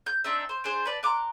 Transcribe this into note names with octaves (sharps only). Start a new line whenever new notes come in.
G6
C4 D4 D#4 E5
C5
D4 G#4 C5
B4 D5 A5
A#5 C6 D6 F#6